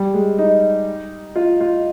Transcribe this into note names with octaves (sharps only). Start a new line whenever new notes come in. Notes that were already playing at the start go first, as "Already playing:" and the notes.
Already playing: G3
G#3
D#4
F4
F4